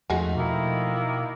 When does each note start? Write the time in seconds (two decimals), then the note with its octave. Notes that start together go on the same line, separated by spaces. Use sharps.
0.10 E2 F3 G#3 A3 D#4 F#4 G#5
0.36 B2 D#3 A#3 E4